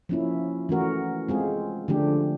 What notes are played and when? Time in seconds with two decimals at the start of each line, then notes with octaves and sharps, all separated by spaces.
0.09 F3 A#3 C#4 E4
0.69 E3 A3 C#4 F#4 A#4
1.29 G#3 C4 F4 G#4
1.88 D3 F3 A3 D4 G4